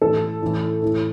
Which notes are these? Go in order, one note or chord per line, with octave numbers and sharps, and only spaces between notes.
A2 E3 A4
A2 E3
A2 E3